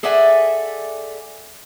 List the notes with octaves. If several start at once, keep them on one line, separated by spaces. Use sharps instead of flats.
G#4 A4 D5 E5 F#5 G#5